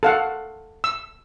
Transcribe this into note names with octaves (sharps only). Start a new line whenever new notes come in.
A4 F5 F#5
E6